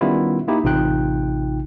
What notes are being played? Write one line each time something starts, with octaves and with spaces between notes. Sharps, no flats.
D#3 G3 B3 C#4 E4 F4
A#3 D#4 E4 G4
A1 C3 D#4 F4 G5 F#6